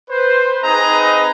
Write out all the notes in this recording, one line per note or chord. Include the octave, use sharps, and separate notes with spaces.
B4 C5
C4 D#4 G#4 B4 D#5 A#5